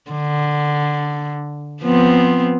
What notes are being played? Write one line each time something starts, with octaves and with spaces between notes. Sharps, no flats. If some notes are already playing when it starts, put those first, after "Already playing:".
D3
F3 B3 C4